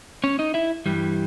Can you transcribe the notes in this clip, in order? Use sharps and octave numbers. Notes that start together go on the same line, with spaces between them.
C#4 C#5
D#4 D#5
E4 E5
G2 E3 G3